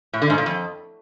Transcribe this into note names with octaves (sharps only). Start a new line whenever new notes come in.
A2
D3
G#2
A#2
F2